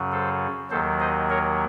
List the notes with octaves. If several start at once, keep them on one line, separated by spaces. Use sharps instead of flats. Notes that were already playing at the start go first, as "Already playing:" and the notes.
Already playing: F#2 C#3 F#3
A4 C5
D#2 D#3 F#3 A4 C5
C5 D#5
A#4 C#5